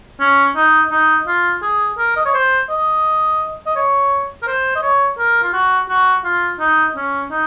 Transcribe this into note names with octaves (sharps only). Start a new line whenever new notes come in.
C#4
D#4
D#4
F4
G#4
A#4
D#5
C#5
C5
D#5
D#5
C#5
A#4
C5
D#5
C#5
A#4
F4
F#4
F#4
F4
D#4
C#4
D#4